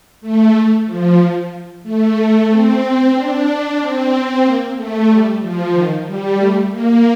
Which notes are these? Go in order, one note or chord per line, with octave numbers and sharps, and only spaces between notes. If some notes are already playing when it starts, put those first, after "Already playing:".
A3
F3
A3
C4
D4
C4
A#3
A3
G3
F3
D#3
G3
A3
A#3